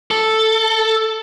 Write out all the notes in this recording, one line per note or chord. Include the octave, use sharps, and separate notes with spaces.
A4